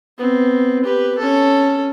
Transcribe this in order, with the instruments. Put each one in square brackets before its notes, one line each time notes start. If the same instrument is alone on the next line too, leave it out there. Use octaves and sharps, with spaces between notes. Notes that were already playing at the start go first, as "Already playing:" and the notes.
[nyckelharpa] B3 C4
G4 B4
C#4 A4